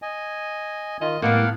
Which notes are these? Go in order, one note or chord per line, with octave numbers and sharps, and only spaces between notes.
D#5 G#5
D#3 F4 D#5
A2 G3 A#3 B3 F5 F#5